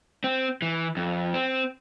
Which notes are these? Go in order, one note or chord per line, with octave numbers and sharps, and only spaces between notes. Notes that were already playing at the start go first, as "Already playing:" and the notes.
C4
E3
F2
C4